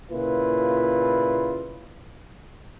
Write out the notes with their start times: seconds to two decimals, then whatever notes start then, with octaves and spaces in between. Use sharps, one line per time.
0.11 A#2 C#3 E4 F4 B4